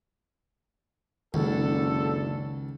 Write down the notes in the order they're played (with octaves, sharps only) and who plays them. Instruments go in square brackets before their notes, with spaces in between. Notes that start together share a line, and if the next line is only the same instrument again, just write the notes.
[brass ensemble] F#1 D3 A4 [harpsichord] C#2 [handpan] D#3